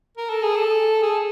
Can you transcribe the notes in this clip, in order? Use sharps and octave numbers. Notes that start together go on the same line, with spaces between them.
A#4
A4
G#4
A4
G#4